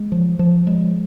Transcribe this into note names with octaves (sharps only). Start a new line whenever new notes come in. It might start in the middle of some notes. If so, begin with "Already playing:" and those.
Already playing: G#3
F3
F3
G#3